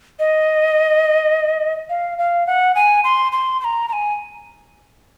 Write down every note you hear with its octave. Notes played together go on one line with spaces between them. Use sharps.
D#5
F5
F5
F#5
G#5
C6
C6
C6
A#5
A#5
G#5